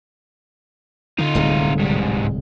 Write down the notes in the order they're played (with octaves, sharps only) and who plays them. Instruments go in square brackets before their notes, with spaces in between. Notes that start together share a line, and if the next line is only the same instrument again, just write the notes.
[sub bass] D3 [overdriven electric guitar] D#4 F4
[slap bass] D1 C2 G#3
[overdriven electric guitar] G#2 G3